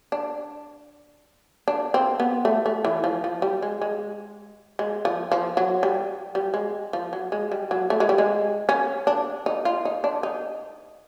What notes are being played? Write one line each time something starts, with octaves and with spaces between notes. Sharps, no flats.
D4
D4
C4
B3
A3
A3
E3
F3
F3
G3
G#3
G#3
G#3
F3
F3
F#3
G3
G3
G#3
F3
F#3
G#3
G3
F#3
A3
G#3
G3
G#3
C#4
D4
D#4
F4
D#4
D4
D#4